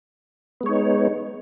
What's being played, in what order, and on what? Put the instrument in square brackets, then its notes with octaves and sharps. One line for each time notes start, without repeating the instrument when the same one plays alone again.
[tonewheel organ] B3
G#3
C#5
D#4